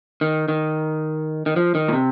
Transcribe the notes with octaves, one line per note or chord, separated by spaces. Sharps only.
D#3
D#3
D#3
F3
D#3
A#2
C3